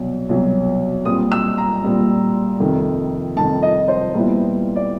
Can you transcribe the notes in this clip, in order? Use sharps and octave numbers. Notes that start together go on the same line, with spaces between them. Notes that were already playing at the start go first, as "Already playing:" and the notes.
Already playing: C2 B2 F#3
C2 B2 F#3
A#2 G3 C4 D#6
E6
A#5
A#2 G3 C4
F2 C3 D#3
F2 C3 D#3 A5
D#5
C5
A#2 G3 B3 E4
D5